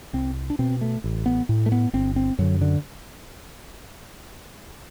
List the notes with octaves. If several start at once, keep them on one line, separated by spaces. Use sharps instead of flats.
C2 C4
D4
B2 C4
A3
A1
B3
A2
A3
B3
G1 C4
C4
F#2 D3 F#3
D3